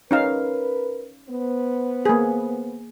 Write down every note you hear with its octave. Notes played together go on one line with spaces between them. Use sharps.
C#4 D#4 A#4 B4 F5
B3 C5
A#3 G#4